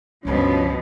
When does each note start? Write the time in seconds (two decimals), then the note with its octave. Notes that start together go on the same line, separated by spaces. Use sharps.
0.25 C#2 G2 B2 F3 B3 C#4